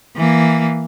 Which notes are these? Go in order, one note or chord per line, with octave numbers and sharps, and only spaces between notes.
E3 A#3